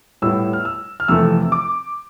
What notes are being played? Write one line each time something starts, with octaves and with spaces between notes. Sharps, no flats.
A2 G3 B3 E4 E6
F6
E6
F6
F2 C3 E3 A3 E6
D6